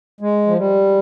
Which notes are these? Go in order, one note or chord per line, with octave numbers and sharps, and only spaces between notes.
G#3
F3
G3